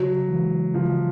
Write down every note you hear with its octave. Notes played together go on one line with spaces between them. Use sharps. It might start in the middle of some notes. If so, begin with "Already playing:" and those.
Already playing: C#3 F#3
E3 G#3
C#3 F3